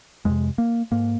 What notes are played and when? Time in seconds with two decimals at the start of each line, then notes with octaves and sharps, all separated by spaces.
0.25 F2 C3 G#3
0.58 A#3
0.92 G#2 A#3